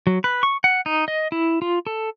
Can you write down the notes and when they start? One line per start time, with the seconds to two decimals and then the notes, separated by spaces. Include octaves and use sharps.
0.07 F#3
0.24 B4
0.43 C#6
0.64 F#5
0.86 D#4
1.08 D#5
1.32 E4
1.62 F4
1.87 A4